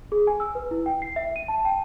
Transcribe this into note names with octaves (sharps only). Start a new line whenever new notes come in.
G#4
G#5
E6
B4
E4
G5
C7
E5
D#7
A5
G5